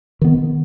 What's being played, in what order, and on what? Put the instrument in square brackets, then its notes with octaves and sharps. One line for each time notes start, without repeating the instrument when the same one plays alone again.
[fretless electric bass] D#3 B3